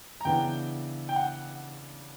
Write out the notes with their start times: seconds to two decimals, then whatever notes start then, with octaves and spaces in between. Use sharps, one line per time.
0.21 A#5
0.25 C#3 E3 B3 D4 G5
1.09 G5
1.16 F#5